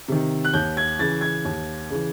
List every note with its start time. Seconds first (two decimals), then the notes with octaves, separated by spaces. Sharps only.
0.08 C3 D#3
0.44 F#6
0.53 D#2 G6
0.77 G#6
0.99 C#3 E3 A6
1.21 G#6
1.44 D#2
1.90 C#3 E3